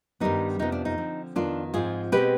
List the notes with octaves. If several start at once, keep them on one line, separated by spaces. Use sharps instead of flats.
G2 D#3 G3 B3 D#4
F2 C3 F3 B3 D#4
D4
D#4
D3 F3 C4
F2 D#3 B3 D4 F4
G#2 F3 C4 F4 G#4
B2 G#3 C4 G4 B4